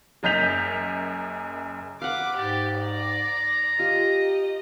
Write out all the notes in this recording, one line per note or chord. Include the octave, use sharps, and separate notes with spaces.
F#1 F#2 D#5 G6 B6 F7
B4 F5 F#5 D6
G#2 G4 D5
D5 A#5
F4 G4 D#5